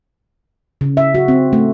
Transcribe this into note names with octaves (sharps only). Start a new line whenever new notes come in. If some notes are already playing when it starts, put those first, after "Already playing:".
C#3
E5
F#4
C4
A3